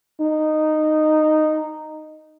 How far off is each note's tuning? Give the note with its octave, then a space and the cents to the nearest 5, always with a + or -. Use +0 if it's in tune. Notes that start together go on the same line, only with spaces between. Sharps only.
D#4 -10